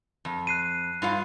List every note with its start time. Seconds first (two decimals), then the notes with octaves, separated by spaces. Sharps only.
0.25 F2
0.47 F#6 C7 D#7
1.02 G2 F4 F5